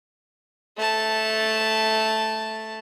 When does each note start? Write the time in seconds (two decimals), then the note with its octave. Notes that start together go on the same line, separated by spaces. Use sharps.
0.77 A3 A5